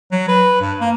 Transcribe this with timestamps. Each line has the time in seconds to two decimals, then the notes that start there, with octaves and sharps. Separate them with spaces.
0.12 F#3
0.28 B4
0.61 G2
0.81 A#3